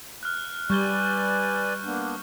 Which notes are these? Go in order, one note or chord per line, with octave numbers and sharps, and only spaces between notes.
F6 F#6
G3 B4 D5 G#5 C#6 G6 G7
A#3 B3 D4